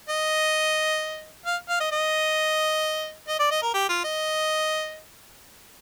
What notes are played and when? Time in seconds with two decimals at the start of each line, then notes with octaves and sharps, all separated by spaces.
0.09 D#5
1.46 F5
1.69 F5
1.80 D#5
1.91 D#5
3.28 D#5
3.39 D5
3.51 D#5
3.62 A#4
3.73 G4
3.89 F4
4.04 D#5